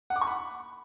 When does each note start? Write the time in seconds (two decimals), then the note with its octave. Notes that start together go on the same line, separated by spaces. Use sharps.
0.10 F#5
0.16 D6
0.21 C#6
0.27 B5